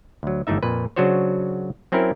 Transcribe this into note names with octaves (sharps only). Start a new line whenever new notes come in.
D2 F#3
G1 E3 A3 D#4 E5
F2 A#2 B4
C#3 F#3 D4 F#4 C5 C#5
F#3 C4 C#4 E4 A#4